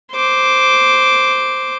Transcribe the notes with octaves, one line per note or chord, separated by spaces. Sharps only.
C5 D6